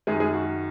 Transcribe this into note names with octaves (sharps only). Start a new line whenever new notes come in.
F#2 D#3 G#3 G#4
G#3 G#4
F#4